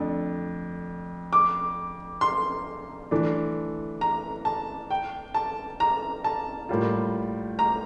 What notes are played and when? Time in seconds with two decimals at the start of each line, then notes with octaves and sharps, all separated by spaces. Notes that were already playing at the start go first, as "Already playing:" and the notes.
Already playing: F2 D3 A3 D4
1.33 D6
2.21 C6
3.11 E3 A3 D4
4.01 A#5
4.45 A5
4.90 G5
5.34 A5
5.80 A#5
6.24 A5
6.69 A2 G3 A#3 F4
7.59 A#5